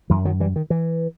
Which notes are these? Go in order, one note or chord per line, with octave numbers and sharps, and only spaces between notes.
F#2 E3
D#3 F#3
E3 G3
D#3
E3